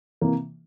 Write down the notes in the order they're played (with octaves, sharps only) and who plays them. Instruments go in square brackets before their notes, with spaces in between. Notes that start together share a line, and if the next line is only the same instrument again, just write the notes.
[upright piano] C3 E3 A#3